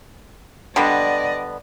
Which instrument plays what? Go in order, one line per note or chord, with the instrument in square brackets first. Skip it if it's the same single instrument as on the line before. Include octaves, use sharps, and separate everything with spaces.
[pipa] D3 G3 B3 [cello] D5 D#5